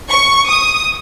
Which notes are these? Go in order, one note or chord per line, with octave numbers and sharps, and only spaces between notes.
C#6
D#6